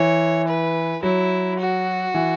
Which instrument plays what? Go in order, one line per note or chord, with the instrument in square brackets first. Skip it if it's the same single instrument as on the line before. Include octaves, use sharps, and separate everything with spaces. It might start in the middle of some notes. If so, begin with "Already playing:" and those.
Already playing: [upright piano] E3 [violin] C#5
[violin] B4
[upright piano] F#3 [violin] E4
[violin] F#4
[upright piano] E3